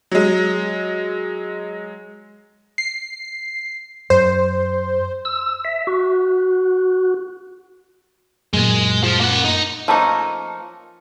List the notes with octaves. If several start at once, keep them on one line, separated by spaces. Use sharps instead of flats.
F#3 G#3
C7
F#2 C5
E6
E5
F#4
F#2 A#2 G#3
F3
A#3 F#5
D#4
F3 A3 A#3 C#4 D#4